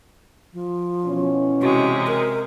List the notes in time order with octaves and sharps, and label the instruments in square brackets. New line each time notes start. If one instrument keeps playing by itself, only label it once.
[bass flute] F3
[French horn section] B2 E3 C#4
[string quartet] C3 G#3 [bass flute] F#4
[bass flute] A#4